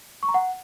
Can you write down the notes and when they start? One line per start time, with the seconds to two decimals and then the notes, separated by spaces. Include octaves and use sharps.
0.23 C#6
0.28 A#5
0.34 F#5